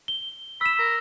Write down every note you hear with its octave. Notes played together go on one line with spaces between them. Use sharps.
G7
B5 E6 E7
A#4